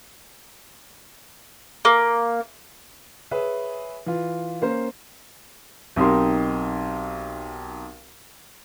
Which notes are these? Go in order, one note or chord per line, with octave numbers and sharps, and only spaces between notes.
A#3
G#4 B4 C#5 E5
E3 F4
A#3 C#4 C5
B1 C4 D#4 G4 A#4 C6